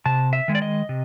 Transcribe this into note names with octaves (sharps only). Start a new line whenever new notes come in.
C3 A5
E5
D#3 G#3
D5
D#5
C3